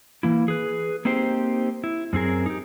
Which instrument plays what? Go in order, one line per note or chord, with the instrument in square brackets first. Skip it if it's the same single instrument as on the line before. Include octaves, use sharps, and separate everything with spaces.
[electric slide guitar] E3 A#3 E4
G#4 B4
A#3 C4 D#4 G4 C5
E4
F#2 C4 G#4 A#4
D#4 G4